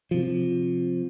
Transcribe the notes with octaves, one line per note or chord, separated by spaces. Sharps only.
C3 F3